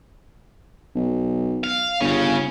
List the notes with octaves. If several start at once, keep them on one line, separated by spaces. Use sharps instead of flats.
B1
F5
G1 C#3 C#4